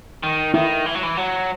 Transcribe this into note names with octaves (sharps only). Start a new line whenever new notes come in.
D#3
D#3 E4
E3
F#3
E3
F#3